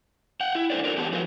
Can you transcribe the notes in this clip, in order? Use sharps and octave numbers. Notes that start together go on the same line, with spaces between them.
F#5 G5
E4
D4 A4 C5 D5
F#4 G4 A4 A#4 D5
E2 D3 B3 G4 A4 A5
D3 F3 F#3 A3 A#4 B4